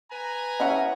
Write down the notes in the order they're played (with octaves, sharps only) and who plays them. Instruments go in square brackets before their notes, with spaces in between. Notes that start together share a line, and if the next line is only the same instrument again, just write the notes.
[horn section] B4 G#5 A#5
[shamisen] C#4 E4 F#5 [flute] E5